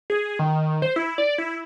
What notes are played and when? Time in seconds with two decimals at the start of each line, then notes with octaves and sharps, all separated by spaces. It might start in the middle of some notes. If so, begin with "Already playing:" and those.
0.10 G#4
0.39 D#3
0.82 C5
0.96 E4
1.18 D5
1.38 E4